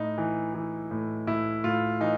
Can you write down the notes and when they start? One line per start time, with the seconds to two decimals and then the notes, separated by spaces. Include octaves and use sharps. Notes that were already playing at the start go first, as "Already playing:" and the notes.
Already playing: A2 D#4
0.18 E3
0.54 E3
0.91 A2
1.27 A2 E4
1.64 A2 F4
2.00 E3 D#4